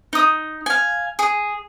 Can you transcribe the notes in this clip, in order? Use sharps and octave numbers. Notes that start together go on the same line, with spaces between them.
D#4 D#6
F5 G#5
G#4